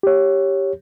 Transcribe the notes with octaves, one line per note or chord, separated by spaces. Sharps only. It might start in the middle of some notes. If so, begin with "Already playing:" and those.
G4 C#5